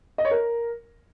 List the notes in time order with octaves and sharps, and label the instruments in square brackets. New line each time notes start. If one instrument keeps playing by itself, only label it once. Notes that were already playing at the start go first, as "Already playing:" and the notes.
[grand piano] D#5
C#5
A#4